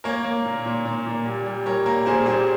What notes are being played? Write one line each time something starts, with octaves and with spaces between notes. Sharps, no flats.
A#3 A#4 C#5
A#3
A#2
A#2
A#2
A#2
G3
G3
G3 A#4 C#5
A#3 A#4
A#2 G#4 C5
G3 G#4 C5